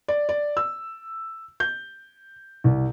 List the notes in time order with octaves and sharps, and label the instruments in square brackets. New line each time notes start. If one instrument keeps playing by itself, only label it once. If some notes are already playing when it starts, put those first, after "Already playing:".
[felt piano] D5
D5
E6
G6
C2